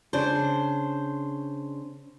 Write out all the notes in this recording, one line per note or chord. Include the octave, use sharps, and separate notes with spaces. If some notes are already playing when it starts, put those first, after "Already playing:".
C#3 D4 C5